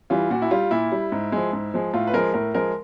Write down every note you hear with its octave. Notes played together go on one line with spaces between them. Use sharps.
E3 G3 F4
A#2 F#4
E4
G3 F4
A#2 E4
G3
G#2
F3 G#3
G#2
F3 G#3
A2 F4
B4
F3 G#3 A#4
A2 A#4
F3 G#3 A#4